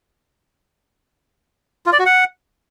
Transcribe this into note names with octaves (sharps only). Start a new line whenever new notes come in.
F4
D5
F#4
F#5